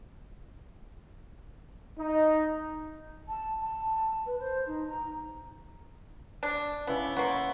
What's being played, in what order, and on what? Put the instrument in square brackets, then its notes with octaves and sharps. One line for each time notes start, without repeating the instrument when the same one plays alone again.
[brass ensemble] D#4
[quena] A5
A5
B4
C5
D#4
A#5
[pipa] D4
[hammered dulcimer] C#3 E4 [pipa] B3
[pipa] A#3 B3 [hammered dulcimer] F#5 C6 C#6